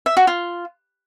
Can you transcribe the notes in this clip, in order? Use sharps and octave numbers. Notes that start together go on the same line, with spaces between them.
E5
F#4
F4